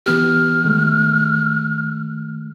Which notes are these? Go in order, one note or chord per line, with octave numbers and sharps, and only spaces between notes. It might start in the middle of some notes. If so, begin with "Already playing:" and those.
E3 B3 G4 F6
D#3 G#3 A3